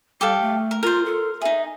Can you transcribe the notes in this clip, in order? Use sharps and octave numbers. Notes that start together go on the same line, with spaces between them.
G3 G4 A4 F5
A3
A#4
F4 A#4 C5
A4
D#4 G#4 E5